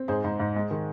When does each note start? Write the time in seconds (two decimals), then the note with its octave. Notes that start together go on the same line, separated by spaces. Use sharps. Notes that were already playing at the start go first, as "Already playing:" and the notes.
Already playing: C4
0.08 G#2 G#4 C5
0.24 G#2
0.40 G#2
0.56 G#3
0.71 D#3